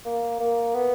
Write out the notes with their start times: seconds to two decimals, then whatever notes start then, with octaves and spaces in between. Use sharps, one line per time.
0.05 A#3
0.40 A#3
0.74 B3